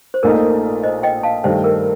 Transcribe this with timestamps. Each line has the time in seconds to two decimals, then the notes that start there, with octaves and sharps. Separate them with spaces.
0.14 C5
0.23 A#1 A#2 A3 D#4 A#4 D5
0.83 C5 D#5
1.03 D#5 G5
1.23 F5 A5
1.44 G2 D#3 A3 C5
1.64 A#4